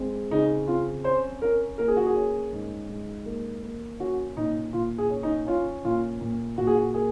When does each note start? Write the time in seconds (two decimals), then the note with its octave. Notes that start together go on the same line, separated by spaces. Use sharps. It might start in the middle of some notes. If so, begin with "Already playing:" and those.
Already playing: G#3 C4
0.31 C#3 D#4
0.68 C4 F4
1.04 C#4 C5
1.42 C#4 A#4
1.78 A#3 A#4
1.88 G#4
1.97 F#4
2.06 G#4
2.15 C#4
2.53 G#2
2.89 G#2
3.26 A#3
3.63 A#3
4.00 C#4 F#4
4.37 A#2 D#4
4.73 A#2 F4
4.98 G#4
5.10 C#4
5.23 D#4
5.47 C#4 F4
5.85 A#2 F4
6.21 A#2
6.57 A#2 F#4
6.67 G#4
6.75 F#4
6.94 A#3 G#4